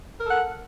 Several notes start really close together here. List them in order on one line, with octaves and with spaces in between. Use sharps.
A#4 A4 F#5